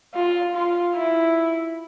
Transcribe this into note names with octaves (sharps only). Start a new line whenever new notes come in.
F4
F4
E4